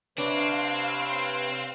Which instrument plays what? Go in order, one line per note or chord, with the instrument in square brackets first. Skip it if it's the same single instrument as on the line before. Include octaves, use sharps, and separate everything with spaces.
[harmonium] C3 B4 C#5 [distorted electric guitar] C4 [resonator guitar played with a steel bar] D4 [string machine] F5 C6